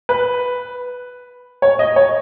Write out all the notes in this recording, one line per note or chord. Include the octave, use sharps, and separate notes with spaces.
B4
C#5
D#5
C#5